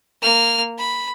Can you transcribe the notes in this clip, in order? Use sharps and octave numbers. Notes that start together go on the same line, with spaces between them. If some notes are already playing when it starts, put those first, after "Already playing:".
A#3 F6
B5